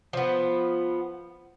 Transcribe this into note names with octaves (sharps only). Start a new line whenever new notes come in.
F3 B3 C5